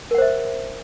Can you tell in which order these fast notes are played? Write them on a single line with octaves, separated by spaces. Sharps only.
A#4 F#5 C5 E5